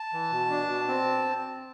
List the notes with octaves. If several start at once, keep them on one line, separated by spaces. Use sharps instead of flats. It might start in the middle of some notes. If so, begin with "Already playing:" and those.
Already playing: A5
E3
B2
D4
B2
C4